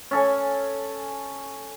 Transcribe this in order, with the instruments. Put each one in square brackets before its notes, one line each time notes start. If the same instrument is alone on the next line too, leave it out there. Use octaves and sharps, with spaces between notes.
[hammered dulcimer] C#4 A4 G#5